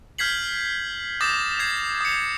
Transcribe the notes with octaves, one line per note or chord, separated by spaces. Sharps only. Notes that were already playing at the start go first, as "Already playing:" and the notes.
F6 G6 G#6 B6 C7 F#7
D6 D#6 G6 A6 A#6 E7
G6 G#6 C7
D#6 C#7